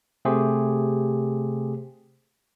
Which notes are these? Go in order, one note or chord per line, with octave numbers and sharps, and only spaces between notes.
C3 A3 G4 G#4 C5